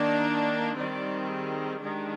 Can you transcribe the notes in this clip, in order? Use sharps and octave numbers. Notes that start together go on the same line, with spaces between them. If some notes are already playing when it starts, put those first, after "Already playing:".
Already playing: D#3 A#3 D4 D5
D#3 G3 C4 D5
G#4
D#3 G#3 D4 G4